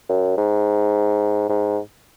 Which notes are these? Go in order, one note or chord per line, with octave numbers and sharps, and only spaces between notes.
F#2
G#2
G#2